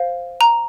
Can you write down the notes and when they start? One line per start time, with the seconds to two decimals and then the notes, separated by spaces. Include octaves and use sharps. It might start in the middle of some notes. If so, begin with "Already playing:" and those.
Already playing: C5 F5
0.41 A#5